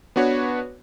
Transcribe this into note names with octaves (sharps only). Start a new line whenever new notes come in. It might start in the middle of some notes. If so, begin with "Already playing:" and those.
B3 D4 F#4 B4 C#5